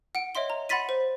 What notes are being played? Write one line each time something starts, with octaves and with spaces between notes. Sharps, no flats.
F#5 D7
C#5 D#5 E5 C6 G7
A#5
F#5 B5 C6 A6 B6 D#7
C5